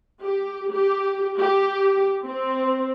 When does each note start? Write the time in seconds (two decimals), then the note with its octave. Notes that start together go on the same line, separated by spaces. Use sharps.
0.21 G4
0.72 G4
1.38 G4
2.24 C4